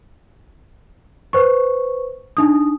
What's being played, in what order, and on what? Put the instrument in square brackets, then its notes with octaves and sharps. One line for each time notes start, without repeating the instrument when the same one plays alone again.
[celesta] B4 C5 C#6
D4 D#4 D#6